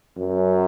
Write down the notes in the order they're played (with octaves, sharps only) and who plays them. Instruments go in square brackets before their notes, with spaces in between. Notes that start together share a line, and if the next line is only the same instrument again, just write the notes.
[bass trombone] F#2